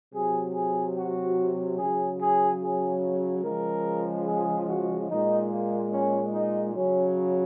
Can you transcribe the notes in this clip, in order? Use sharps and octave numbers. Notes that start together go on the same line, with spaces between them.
C3 F#3 G#4
G#4
F#4
C#3 F#3 G#4
G#4
G#4
C#3 F3 G#3 A#4
G#4
F#4
A#2 G#3 D#4
A#3
C#4
D#4
C#3 F#3 C#4